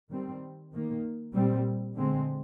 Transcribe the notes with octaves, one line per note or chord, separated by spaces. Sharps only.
D#3 G3 C4
D#3 A#3
A#2 G3 C4
D3 G#3 C4